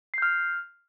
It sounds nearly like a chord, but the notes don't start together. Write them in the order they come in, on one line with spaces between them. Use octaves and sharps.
C7 G6 F6